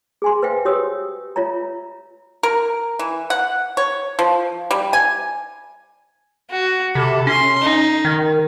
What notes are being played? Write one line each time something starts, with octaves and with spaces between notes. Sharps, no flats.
G#4 G#5 C6
B4 C5 E5 F5 G5
F#4 G4 C#5 D#6 E6
F4 C#5 E5 A#5
A#4
E3
F#5
C#5
F3
G3
G#5
F#4
C3 A4 B5
C#4 C6
D#4
D#3